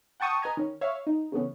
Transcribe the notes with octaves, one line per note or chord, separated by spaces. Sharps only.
F#5 G5 A5 C#6 D#6
B4 D#5 G#5 A#5
D#3 C#4
C#5 E5 F5
D#4
C#3 E3 A3 B3 C#4